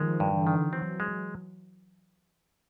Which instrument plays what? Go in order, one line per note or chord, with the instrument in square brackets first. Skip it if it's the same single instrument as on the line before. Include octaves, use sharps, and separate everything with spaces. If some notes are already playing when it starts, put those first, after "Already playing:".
Already playing: [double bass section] D#3 F3 [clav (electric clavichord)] G#3
[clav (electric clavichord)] G2
[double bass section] D3 E3
[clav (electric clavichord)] D#3
[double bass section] E3 F#3 [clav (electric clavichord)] C4
[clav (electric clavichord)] G#3